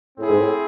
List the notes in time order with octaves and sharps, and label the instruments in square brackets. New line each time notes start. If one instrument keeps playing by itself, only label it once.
[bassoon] A2 [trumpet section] C4 E4 G#4
[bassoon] G#2
A2